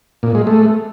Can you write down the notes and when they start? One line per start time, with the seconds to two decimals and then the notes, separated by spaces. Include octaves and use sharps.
0.23 A#2
0.35 G#3
0.47 A3